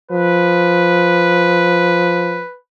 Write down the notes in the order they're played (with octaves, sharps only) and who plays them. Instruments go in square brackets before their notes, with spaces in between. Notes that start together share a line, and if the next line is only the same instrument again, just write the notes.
[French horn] F3 [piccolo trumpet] B4